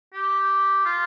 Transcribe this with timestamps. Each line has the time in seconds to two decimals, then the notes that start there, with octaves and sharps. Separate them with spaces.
0.14 G4
0.85 F4